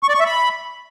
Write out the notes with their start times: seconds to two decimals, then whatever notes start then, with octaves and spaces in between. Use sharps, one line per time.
0.03 C#6
0.09 D5
0.14 C#6
0.20 E5
0.26 B5